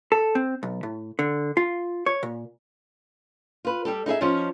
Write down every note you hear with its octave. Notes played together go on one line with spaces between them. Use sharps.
A4
C4
B1
A2
D3
F4
C#5
A#2
F4 B4
G3 G4 A4
D#4 E4 G#4 E5
F3 C#4 D#4 F4